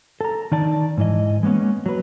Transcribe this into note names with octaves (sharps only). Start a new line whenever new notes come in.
A4 A#5
D#3 D#4 D5 A5
G#2 E3 D#5
G#3 A#3 B3 C#4
F#3 B4